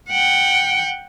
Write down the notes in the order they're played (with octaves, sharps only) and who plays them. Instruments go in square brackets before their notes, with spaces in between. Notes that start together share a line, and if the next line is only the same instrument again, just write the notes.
[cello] F#5 G5